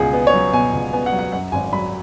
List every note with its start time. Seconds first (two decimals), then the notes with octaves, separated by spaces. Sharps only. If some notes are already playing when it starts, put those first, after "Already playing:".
Already playing: C#2 B2 G#4
0.13 B3
0.27 C#5
0.34 F#3
0.53 B2 G#5
0.73 C#2
0.93 B3 G#5
1.06 F#5
1.13 F#3
1.19 F#5
1.32 F#2 F#5
1.52 G#1 G#5
1.72 F#3 B5